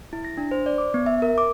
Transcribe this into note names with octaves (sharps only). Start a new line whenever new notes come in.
E4
A#6
D4
C5
D5
D6
B3
E5
A#4
D6